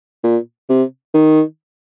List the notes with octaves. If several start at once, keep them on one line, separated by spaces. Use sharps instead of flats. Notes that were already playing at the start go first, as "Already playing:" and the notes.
A#2
C3
D#3